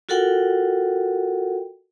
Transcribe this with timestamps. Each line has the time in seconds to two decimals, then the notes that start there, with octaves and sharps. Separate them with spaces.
0.09 F4 F#4 A4 A#4 F#5 G5